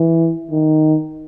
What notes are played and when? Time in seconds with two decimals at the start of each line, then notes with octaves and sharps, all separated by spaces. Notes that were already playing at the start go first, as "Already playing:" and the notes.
Already playing: E3
0.51 D#3